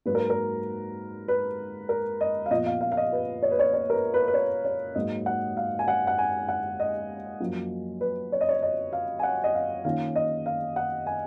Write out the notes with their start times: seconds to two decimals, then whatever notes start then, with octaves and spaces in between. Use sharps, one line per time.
0.05 G#2 F#3 A#3 B4
0.15 A#4
0.30 A#4
1.28 B4
1.89 A#4
2.21 D#5
2.46 F5
2.51 A#2 F3 B3 D#5
2.66 F5
2.81 F5
2.92 F5
2.97 D#5
3.12 B4
3.43 C#5
3.51 B4
3.59 C#5
3.73 C#5
3.90 A#4
3.94 B4
4.14 B4
4.28 B4
4.34 C#5
4.65 C#5
4.95 G#2 F#3 A#3 D#5
5.26 F#5
5.57 F5
5.79 G#5
5.88 F#5
6.07 F#5
6.18 G#5
6.48 F#5
6.80 D#5
7.40 F#2 F3 A#3
8.01 B4
8.32 C#5
8.41 D#5
8.49 C#5
8.63 D#5
8.93 F5
9.19 G#5
9.23 F#5
9.44 D#5
9.54 F5
9.84 D#3 A#3 C#4 F4 F5
10.16 D#5
10.46 F5
10.76 F#5
11.07 G#5